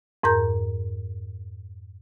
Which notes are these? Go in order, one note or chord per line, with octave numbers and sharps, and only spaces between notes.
F2 G#2 A#4 A#5 G6